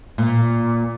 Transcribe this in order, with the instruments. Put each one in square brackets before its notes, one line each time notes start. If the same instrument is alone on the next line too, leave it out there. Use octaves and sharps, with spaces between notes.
[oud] A#2